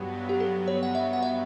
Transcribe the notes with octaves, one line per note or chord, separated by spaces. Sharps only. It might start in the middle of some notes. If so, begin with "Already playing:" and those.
Already playing: G2 F#3 B3 G4
G4
A4
C#5
F#5
E5
F#5
E5